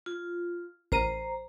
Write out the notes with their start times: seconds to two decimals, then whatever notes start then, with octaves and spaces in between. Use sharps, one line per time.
0.06 F4
0.92 A1 A#4 C5 A#5 D#7